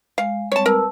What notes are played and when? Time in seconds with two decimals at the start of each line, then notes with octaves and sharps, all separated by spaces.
0.18 G#3 F5
0.52 G3 G#3 C4 C#5 A5
0.66 A#4 B4 A5 E6